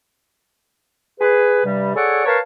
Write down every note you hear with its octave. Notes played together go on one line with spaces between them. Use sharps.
G#4 B4
G2 C3 G3
G#4 A4 C#5 D5 F#5
A#4 B4 C#5 F5 A5